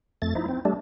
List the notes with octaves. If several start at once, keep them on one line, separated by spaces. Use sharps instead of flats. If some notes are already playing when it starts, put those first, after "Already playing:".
F2 A3 A6
F3 D#4 E4
C4
G3 A3 D4